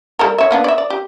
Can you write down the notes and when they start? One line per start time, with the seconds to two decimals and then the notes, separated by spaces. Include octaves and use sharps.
0.19 G3 A4 A#4
0.38 C#5 E5
0.51 A#3 B3 D4
0.64 D5 E5
0.78 D5
0.90 G4